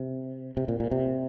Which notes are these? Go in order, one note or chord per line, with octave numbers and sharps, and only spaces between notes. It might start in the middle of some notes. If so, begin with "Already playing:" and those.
Already playing: C3
C3
A#2
A#2
C3